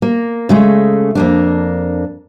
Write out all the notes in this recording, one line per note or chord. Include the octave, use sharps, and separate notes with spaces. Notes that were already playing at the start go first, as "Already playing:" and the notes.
A#3
C#3 G#3 A3
F2 A#3 D4